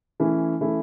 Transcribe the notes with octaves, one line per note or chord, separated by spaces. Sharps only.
E3 A3 C#4 E4
E3 A3 C#4 E4